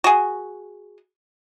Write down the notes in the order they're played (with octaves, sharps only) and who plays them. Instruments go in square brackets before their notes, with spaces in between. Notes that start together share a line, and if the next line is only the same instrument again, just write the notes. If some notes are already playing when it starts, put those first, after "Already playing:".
[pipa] F#4 G#4